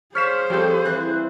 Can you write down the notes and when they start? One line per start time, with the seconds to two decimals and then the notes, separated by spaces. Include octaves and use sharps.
0.15 G#4 C5 C#5 F5 F6 B6 E7
0.50 F3 G3 C4 G4 A4
0.85 E3 F#6